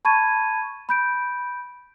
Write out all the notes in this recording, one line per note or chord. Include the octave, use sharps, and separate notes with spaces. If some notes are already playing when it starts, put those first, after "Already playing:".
A5 B5 C#6 G#6 A6 D#7
B5 G6 D7